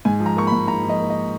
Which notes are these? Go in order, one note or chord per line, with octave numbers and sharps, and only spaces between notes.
G#2 G#5
F3
A#5
A#3 C#6
B5
G#2
G#2 A#5
F3
D#5
A#3
D#5